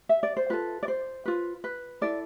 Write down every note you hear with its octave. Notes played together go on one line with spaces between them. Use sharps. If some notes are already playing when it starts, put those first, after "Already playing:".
E5
D5
C5
F4 A4 B4
D5
C5
F4 B4
B4
E4 A4 D5